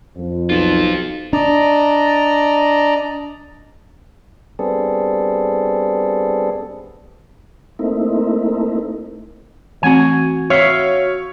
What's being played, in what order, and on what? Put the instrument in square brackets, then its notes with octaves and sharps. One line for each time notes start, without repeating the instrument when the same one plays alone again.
[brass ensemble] F2
[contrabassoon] B1 [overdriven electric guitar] C4 F4
[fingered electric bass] D4 [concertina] D5 D#5 A#5
[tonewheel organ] G3 B3 C4 D4 G#4 A4
A3 A#3 C4 D#4 E4
[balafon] E3 A3 C4 [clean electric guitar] F#4 G#5
[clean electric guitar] F#4 E5 F5 [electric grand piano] C#5